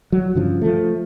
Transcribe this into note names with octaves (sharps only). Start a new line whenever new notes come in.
F#3
G2 C#3 F3
F3 A3